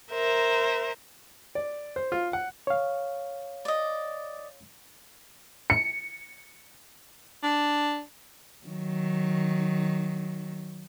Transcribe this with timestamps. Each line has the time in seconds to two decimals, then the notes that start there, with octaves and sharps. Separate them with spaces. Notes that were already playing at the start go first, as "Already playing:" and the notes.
0.11 A#4 C5 E5 A#5
1.55 D5
1.96 C5
2.12 F4
2.33 F#5
2.67 C#5 F5
3.65 D5 D#5
5.70 C#7
7.43 D4
8.67 D#3 F#3